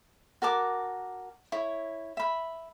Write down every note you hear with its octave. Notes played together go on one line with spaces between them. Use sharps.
F#4 A#4 A5 D6
E4 C#5
E5 B5